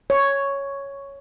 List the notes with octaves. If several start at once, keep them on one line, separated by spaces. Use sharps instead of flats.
C#5